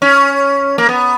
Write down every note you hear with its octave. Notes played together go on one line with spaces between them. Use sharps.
C#4
A#3
B3